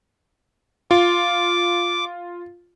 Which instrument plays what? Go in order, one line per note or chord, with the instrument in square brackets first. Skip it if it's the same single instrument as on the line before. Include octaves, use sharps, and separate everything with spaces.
[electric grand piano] F4 [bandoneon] D6